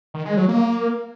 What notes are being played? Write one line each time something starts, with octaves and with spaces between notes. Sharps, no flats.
D#3
G#3
F#3
A#3